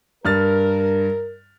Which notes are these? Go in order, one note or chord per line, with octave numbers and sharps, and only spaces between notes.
G2 A#4 F6 A6